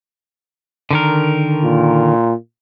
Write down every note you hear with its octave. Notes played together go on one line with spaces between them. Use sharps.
D3 D#3 A#4
A#2